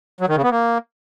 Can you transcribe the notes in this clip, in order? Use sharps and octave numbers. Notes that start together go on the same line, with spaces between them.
F#3
D#3
C#3
B3
A#3